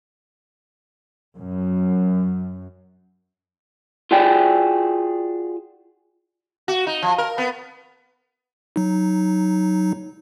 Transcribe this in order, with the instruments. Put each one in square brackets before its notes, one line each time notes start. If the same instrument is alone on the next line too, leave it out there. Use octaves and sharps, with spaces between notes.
[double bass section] F#2
[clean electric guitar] F4 F#4 G#4 D5 G5
[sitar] F#4
D#4
F3
A#4
B3
[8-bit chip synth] F#3 D#4